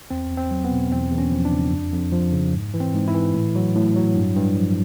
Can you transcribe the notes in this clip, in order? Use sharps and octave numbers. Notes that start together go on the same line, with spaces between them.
E2 C4
E2
C4
F#3
B3
B2
E2 C4
E2
C#4
F3
D4
C#3
F2
F2
F3
C#3
G#2
E3
C4
G#2
E4
E3
A2
F#3
A2
F#3
G2
G2
F3